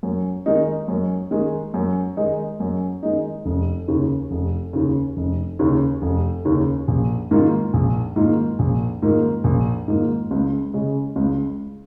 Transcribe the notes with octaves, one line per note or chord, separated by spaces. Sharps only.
F#2
D#3 G#3 D#4
F#2
D#3 G#3 D#4
F#2
D#3 G#3 D#4
F#2
D#3 G#3 D#4
F1
D#2 C#3
F1
D#2 C#3
F1
D#2 C#3
F1
D#2 C#3
A#1
G#2 D#3 A#3 F4
A#1
G#2 D#3 A#3 F4
A#1
G#2 D#3 A#3 F4
A#1
G#2 D#3 A#3 F4
C#2
C#3 G#3
C#2